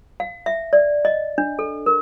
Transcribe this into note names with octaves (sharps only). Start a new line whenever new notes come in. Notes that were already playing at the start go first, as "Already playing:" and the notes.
F5
E5
D5
D#5
D4
A4
A#4